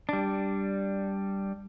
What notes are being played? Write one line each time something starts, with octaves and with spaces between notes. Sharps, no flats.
G3 D4